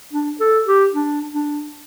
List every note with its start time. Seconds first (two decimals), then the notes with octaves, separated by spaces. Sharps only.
0.13 D4
0.40 A4
0.66 G4
0.93 D4
1.34 D4